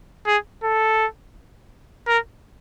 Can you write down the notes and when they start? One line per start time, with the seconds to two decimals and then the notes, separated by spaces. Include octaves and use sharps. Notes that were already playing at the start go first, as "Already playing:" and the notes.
0.26 G#4
0.63 A4
2.07 A#4